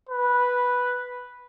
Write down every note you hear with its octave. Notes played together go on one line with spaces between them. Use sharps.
B4